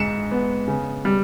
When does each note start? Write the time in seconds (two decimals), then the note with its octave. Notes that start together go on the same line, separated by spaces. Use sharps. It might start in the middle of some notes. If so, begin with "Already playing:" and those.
Already playing: G#2 G#3 C#7 E7
0.31 B3
0.68 C#3
1.05 G3